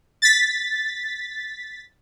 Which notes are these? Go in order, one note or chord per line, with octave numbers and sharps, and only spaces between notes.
A6 B6